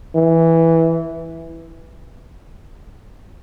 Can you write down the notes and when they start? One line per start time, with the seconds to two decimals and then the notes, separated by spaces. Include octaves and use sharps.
0.16 E3